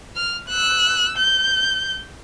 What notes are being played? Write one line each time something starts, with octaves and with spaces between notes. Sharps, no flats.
F6
E6 F#6
G6